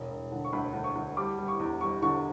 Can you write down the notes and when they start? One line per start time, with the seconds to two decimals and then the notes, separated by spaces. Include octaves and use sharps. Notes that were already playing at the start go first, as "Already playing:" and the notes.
Already playing: E1
0.10 E1
0.32 D3
0.44 C#6
0.53 D2 B5
0.73 D2
0.84 C#6
0.95 D2
1.16 G3 D6
1.38 G3
1.48 C#6
1.59 E2
1.80 G3 C#6
2.02 D3 C#6